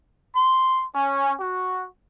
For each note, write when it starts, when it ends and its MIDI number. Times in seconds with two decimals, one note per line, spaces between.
0.34 0.85 84
0.95 1.34 61
1.40 1.86 66